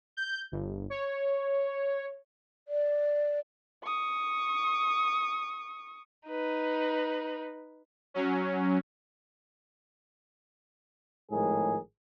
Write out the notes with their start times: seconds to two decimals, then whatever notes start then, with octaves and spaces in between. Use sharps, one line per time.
0.17 G6
0.52 G1
0.90 C#5
2.68 D5
3.84 C#6 D#6
6.27 D#4 B4
8.14 F#3 C#4
11.31 G#1 A2 F3 G#3 G#4 A#4